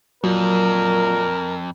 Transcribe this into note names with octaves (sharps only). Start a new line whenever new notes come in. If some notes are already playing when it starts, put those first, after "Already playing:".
F2 A#2 F#3 A#4